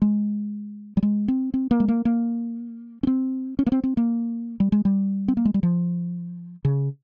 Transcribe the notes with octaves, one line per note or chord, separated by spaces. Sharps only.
G#3
G3
G#3
C4
C4
A#3
G#3
A#3
A#3
C#4
C4
C#4
A#3
C4
C4
A#3
G3
G#3
G3
C4
A#3
G#3
G3
F3
C#3